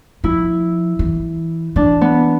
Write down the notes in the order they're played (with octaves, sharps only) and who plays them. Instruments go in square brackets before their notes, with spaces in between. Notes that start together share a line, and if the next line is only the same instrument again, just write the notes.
[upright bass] F3 [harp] E4
[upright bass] E3
[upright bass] E3 [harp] D4
[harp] B3